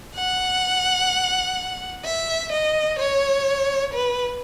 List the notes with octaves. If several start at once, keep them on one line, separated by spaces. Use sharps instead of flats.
F#5
E5
D#5
C#5
B4